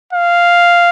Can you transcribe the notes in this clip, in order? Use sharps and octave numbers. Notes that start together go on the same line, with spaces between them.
F5